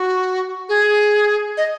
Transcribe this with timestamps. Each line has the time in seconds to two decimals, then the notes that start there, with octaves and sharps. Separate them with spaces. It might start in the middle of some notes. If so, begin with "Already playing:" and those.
Already playing: F#4
0.69 G#4
1.57 D#5